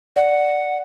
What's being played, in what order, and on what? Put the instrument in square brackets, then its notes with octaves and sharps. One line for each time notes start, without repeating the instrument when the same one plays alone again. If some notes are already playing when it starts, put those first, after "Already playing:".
[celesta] D5 [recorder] F#5